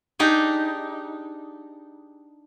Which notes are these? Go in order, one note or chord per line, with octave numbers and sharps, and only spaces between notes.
D4 D#4 G4 G#4